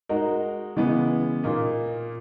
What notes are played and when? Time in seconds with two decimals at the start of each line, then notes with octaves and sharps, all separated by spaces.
0.09 G#3 D#4 F#4 A#4
0.76 C#3 E3 G#3 B3
1.43 A#2 A#3 D#4